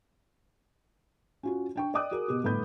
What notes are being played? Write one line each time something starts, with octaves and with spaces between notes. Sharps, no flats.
C#4 F4 F#4
D4 G5 C#6
D5 D#5 G5 D6 D#6 F#6
F#4 G#4 A#4
B2 G4
G1 A2 B3 B5 G6